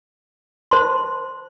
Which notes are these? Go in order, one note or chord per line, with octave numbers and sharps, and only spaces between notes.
C5 A5 C6